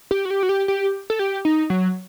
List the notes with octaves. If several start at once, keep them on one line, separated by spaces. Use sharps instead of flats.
G4
F#4
G4
F#4
G4
G4
A4
G4
D#4
F#3